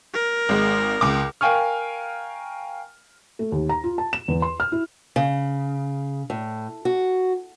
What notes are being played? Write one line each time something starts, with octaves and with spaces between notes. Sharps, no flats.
A#4
G#1 G#3
C#2 D6
A#4 F5 G5 G#5 C#6 F6
A3
D#2
A#5
F4
A5
E7
E2
C6
F6
E4
C#3
A2
F#4